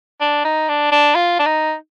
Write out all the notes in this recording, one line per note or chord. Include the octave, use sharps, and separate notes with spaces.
D4
D#4
D4
D4
F4
D4
D#4